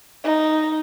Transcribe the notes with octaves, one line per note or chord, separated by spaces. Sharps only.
D#4